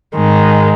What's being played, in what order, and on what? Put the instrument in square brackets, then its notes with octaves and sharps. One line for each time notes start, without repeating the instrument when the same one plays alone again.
[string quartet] G#2 D#3 G#3